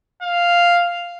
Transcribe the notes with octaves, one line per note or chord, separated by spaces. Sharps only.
F5